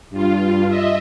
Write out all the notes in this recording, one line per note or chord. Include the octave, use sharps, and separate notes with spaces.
G2 F4
D#5 E5